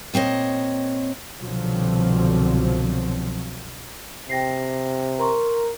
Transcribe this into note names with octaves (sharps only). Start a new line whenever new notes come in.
A#2 C4 C#5 D#5
C2 B2 D3 F3 F#3 C4
C3 G5 A#6 C7
A#4 A#5 C6 C#6